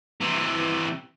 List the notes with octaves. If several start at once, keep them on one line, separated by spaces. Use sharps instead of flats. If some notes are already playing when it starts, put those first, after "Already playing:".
C3 E3